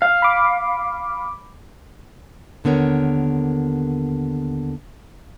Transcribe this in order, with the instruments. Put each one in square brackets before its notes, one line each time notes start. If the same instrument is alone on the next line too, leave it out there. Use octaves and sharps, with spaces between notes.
[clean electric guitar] F5
[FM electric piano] B5 D6
[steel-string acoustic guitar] D#2 D3 B3 A#4 C#5